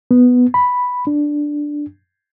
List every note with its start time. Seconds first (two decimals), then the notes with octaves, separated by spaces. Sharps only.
0.11 B3
0.54 B5
1.07 D4